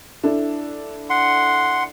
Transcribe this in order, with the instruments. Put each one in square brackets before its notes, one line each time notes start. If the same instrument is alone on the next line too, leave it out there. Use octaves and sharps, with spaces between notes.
[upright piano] D4 E4 A4
[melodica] F#5 C6